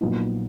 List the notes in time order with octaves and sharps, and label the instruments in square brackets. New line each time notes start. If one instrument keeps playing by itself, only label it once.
[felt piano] A#1 A#2 F#3 B3 D#4